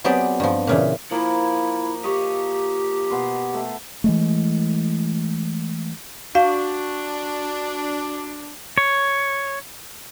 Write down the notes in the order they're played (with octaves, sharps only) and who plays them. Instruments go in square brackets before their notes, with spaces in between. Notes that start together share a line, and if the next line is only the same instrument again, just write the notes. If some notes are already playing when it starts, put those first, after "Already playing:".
[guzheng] F#3 B3 C4 G4 G#4 D5
G2 F3
A#2 C#3 E3
[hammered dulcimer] F3 A#3 [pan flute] E4
[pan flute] G4 [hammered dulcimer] D#5 C#6
[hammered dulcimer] B2 C6
A3
[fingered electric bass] E3 G#3 A3
[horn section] D4 [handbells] F#4 [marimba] F5
[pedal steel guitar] C#5